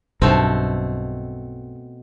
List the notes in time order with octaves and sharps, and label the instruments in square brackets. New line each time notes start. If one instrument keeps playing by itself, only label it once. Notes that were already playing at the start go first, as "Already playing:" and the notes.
[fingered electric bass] B1 G2 [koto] B2 A3 C4